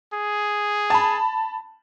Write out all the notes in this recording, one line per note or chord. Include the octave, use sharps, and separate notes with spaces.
G#4
A5 B5